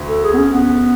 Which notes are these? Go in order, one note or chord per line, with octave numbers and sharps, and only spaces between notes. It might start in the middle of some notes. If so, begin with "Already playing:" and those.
Already playing: D2
A4
G#4
B3
C#4
B3